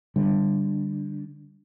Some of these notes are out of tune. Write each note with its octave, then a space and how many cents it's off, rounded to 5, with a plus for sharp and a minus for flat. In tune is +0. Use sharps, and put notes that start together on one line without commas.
D3 +0 G3 +0